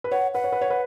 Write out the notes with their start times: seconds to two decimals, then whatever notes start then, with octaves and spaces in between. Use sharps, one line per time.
0.04 B4
0.12 C#5 F#5
0.34 B4 F#5
0.44 C#5
0.52 B4
0.61 C#5
0.70 B4